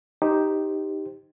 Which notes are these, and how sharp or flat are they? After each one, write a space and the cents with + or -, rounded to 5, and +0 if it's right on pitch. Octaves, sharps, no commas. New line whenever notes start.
D#4 +0 G4 +0 C5 +0